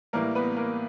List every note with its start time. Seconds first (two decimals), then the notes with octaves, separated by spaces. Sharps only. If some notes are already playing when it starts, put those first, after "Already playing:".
0.13 A2 E3 G3 A#3 A#4
0.35 B3 B4
0.57 A#3 A#4